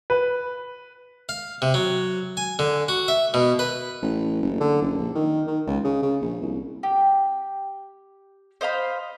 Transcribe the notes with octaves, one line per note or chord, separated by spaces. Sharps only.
B4
F5
C3
F#3
G#5
D3
F#4
E5
B2
B4
A1
F#1
D3
F#1
A#1
D#3
D#3
C#2
C#3
C#3
A#1
C2
G4
C5 D#5 F5 B5